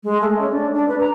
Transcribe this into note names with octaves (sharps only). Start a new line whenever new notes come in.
G#3
A3
C#4
D4
D4
B4
A#5